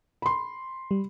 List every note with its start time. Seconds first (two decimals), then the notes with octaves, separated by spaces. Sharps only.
0.22 B5 C6
0.91 G3